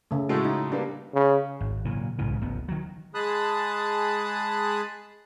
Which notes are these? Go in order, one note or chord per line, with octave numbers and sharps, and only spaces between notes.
C#3 A3
A2 G#3 A3 F#4
D#4
G3 A#3 B3 D4
C#3
G#1
A#2 C#3 E3 F#3
B1 G#2 C#3 E3
D1 A1 B3
D#3 F#3
G#3 G#4 A5 B5 D#6 F#6